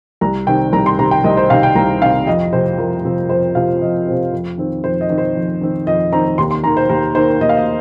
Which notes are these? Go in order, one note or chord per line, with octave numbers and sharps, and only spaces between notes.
C2 A#5
C3 D#3 C4 G5
C2 A#5
C6
C3 D#3 C4 A#5
G5
C2 D#5
C5
C3 D#3 C4 F5
G5
C2 A#5
C3 D#3 C4 F5
F2 D#5
C3 F3 C4 C5
F2 A#4
C3 F3 C4
F2 C5
C3 F3 C4 F5
F2 D#5
C3 F3 C4
F2
D#3 C4
F2 C5
D#5
D#3 C4
C5
F2
D#3 C4
F2 D#5
D#3 C4 A#5
D#2 C6
C6
D#3 A#3 A#5
C5
D#2 A#4
D#3 A#3 C5
D#2 D#5
F5
D#5